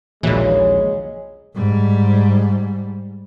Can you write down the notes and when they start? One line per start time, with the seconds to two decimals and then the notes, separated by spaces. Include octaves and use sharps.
0.23 A#1 D#2 A#2 C#3 E3 F#3 G#3
1.55 G#2 G3